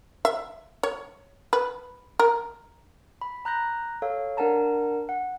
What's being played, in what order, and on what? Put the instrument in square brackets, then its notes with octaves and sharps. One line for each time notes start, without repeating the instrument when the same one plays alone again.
[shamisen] E5
C#5
B4
A#4
[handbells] B5
A#5 F#6 G6 A#6
A4 C#5 F5
D4 A#4 F#5 A5 A#5
F#5